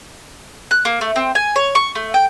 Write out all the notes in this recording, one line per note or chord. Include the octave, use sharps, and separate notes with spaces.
F#6
A#3
A3
C4
G#5
C#5
C#6
A3
G5